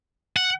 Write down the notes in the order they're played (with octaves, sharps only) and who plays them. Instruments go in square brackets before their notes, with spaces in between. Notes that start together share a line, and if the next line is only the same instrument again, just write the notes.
[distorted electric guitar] F#5